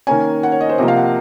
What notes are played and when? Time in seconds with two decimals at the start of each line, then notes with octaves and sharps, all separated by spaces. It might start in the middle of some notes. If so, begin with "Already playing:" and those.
0.07 D#3 A#3 C#4 G#5
0.43 F#5
0.52 C#5
0.61 D#5
0.69 C5
0.78 C3 F3 A#3 D#5
0.88 F5
0.97 F#5